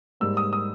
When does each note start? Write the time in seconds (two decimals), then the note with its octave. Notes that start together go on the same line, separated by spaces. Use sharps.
0.20 G#2 G3 A#3 E6
0.37 D#6
0.53 D#6